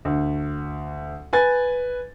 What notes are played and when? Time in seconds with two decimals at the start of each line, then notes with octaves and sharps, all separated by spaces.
0.05 D2
1.33 B4 G#5 A6